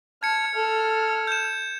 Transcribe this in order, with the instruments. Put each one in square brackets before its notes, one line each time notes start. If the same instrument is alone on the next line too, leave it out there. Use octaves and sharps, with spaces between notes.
[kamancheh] A5 F6 [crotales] G#6 C#7
[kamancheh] A4 F6
[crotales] G6 E7